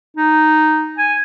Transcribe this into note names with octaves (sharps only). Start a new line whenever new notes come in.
D#4
G#5